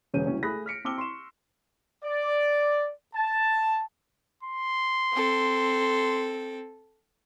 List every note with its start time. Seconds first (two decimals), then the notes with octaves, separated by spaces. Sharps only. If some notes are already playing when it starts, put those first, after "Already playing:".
0.14 E1 C#3 C#4 G6 D#7
0.26 C2 C#4 F#4 C#5
0.43 A3 G#4 B5 D#6 F#6 A#6
0.66 F6 B6 C#7 D7
0.85 C4 A5 D6 E6 F6 G7
0.98 C6 C#6 E7
2.04 D5
3.14 A5
4.43 C6
5.13 C4 A4